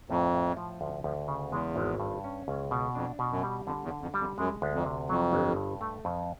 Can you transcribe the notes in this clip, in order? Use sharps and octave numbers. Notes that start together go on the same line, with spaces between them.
F2 A2
A2
F3
D2
D2
C#3
E2 G#3
G#1
G2
C#4
C#2
B2
F2 D4
B2
F#2
G3
F2 D3
E2
D3
F2
G3
F2
F#2 G#3
D2
F2
C3
F2 F#3
G1
G2
A3
F2